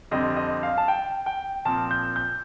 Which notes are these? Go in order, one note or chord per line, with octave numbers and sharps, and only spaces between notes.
F2 D3 G3 C4 D#5
D#5
F5
A5
G5
G5
A#2 F3 C4 A5
G6
G6